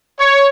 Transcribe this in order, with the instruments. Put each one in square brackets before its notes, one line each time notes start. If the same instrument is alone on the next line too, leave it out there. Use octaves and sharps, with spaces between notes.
[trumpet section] C#5